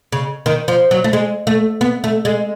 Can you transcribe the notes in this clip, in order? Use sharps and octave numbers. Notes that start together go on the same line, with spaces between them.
C#3
D#3
F3
F#3
A3
G#3
A3
B3
A3
G#3